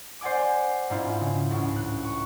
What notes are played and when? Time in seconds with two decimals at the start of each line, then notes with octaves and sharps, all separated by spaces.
0.21 C5 D5 F#5 G#5 D6
0.90 G#2 C4 D4 E4 F4
1.20 C#3
1.50 C#2 A2 F#3
1.76 F#6
2.04 C#6